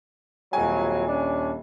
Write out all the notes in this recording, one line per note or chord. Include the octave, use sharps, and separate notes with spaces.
D#1 F2 F#3 G#5
C#4 D4